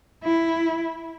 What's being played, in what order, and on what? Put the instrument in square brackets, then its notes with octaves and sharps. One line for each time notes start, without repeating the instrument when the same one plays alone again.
[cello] E4